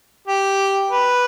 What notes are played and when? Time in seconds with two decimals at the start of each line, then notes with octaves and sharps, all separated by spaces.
0.27 G4
0.90 B4